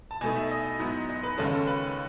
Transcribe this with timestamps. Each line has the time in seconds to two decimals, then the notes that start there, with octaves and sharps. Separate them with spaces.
0.11 A5
0.21 B2 A3 D#4 G#5
0.36 E5
0.51 D#5
0.79 G#2 F#3 B3 E4
1.09 D#5
1.23 B4
1.38 D#2 C#3 G#3 C#4 A4
1.52 A4
1.67 B4